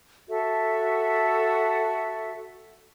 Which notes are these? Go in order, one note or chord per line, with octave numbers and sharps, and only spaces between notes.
F#4 A4 E5